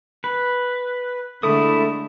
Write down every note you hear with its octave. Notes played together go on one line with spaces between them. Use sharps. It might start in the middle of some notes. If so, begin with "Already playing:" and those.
B4
D3 G#3 A3 E4 D#6